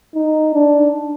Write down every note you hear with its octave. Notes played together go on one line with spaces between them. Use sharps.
D#4
D4